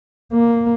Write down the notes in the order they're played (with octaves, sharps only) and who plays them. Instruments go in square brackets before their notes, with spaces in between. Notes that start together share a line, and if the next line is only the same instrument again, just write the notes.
[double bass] A#3